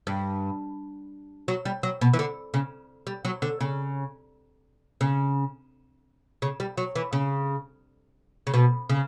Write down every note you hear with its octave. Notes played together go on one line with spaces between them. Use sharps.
G2
F#3
G3
F#3
B2
E3
D3
C#3
G3
F#3
D3
C#3
C#3
C#3
G3
F#3
E3
C#3
C#3
B2
C#3